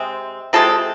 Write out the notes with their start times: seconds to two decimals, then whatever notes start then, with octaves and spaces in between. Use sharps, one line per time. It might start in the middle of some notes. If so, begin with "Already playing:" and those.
Already playing: C3 G#3 C4
0.53 C3 G#3 C4 F4 A4